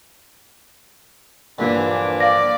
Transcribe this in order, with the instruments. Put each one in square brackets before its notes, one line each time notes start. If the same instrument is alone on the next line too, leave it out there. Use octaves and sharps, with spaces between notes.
[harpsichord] G2 A#2 D3 [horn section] E3 F3 D4
[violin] D5 [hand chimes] F5 A#6